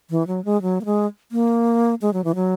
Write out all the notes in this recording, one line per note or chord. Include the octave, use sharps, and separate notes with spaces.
E3
F#3
G#3
F#3
A#3
G#3
A#3
G#3
F#3
E3
F#3